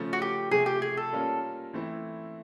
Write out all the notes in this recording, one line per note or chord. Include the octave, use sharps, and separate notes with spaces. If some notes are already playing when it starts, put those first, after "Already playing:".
Already playing: C#3 F3 A3 C#4
F#4
G4
C3 F3 A3 G#4
G4
G#4
A4
G3 A#3 C#4 F4 A#4
E3 A3 C4 E4